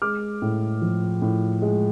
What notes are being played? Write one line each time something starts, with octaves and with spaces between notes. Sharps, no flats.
G#3 D6 F6
A2
F3
A2
G#3